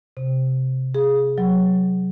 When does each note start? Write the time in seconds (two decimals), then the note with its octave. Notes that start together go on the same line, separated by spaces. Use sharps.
0.17 C3
0.95 G#4
1.38 F#3